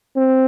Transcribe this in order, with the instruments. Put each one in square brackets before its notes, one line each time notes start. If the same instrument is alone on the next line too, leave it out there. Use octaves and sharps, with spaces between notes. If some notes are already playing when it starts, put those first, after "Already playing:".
[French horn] C4